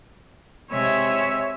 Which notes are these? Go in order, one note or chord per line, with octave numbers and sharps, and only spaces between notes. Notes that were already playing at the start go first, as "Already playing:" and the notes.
C3 G#3 C#5 E5